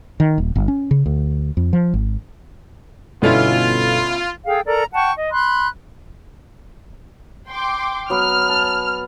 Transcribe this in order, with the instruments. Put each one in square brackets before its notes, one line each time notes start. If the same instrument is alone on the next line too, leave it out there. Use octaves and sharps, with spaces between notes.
[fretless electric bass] D#3
D#1
G1
C#4
C#3
D2
F2
F3
G#1
[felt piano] G1 B2 A4 [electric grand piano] B3 C#4 E4 [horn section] F4
[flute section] G#4 A4 F5 G5
A4 A#4 D5 A#5
F#5 G5 A5 C#6
D#5
B5 C6 F#6
[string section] G5 C6 D6
[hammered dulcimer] F#3 B3 [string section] F6
[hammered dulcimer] A5